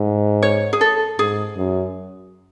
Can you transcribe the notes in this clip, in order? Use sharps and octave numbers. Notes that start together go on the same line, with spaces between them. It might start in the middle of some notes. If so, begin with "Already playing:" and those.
Already playing: G#2
C#5
G#4
A4
G#2 G#4
F#2